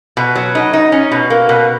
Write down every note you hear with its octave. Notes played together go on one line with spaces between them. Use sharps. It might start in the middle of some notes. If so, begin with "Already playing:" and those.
B2
F#3
D#4
D#4
C#4
B2
A#3
B2